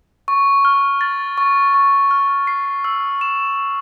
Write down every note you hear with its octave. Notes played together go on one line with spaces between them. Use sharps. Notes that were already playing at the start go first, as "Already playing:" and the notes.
C#6
F6
A6
C#6
C#6
F6
C7
E6
E7